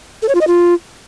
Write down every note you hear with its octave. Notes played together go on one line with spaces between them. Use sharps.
A4
C#5
F4
D#5
F4